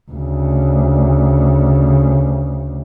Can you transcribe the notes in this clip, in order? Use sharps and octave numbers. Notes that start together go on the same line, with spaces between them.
D2 C#3